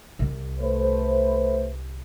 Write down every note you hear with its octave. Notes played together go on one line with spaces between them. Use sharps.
C2
A3 B4 C5